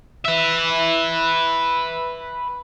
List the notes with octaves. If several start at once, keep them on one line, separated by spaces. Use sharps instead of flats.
B4 E5